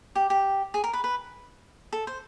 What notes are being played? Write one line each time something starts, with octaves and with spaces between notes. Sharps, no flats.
G4
G4
G#4
A#4
B4
B4
A4
C5